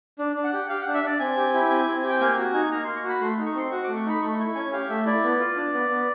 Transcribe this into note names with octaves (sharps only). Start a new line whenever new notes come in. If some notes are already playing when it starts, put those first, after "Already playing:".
D4
D4
F#5
G4
G4 F5
D4 F#5
E5
D4 D5
C4 G#5
G4
E4
C4
C4
G4
G5
A#3 G#5
F#4 G#5
D#4 G#5
A#3 A#5
A#3 C6
C#6
F#4
B5
A3 C6
D#4
C#6
C4 C6
F#4 C#6
A3 D6
C#6
D#4 B5
A3 C#6
E4 C#6
C#4 G#5
G4 F5
A3 E5
E4 D5
B3
F4
D4
B3
B3